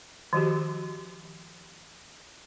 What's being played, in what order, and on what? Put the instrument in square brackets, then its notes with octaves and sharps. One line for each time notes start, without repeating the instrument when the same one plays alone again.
[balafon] D#3 F3 F#4 G4